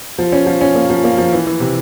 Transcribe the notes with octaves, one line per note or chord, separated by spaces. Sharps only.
F3
C#4
F3
C#4
A#3
F3
A#3
F3
E3
E3
C3